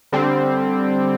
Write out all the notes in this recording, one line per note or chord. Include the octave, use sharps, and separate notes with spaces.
D3 G3 C4